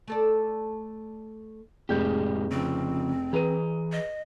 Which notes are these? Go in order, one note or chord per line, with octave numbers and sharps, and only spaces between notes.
A3 A4 D5
F1 A2 G#3 G4 G#4 G6
C#3 F3 C4
E3 G#4 B4 A#5 D#7
D#5